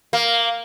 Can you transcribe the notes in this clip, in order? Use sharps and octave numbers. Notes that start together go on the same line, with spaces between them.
A#3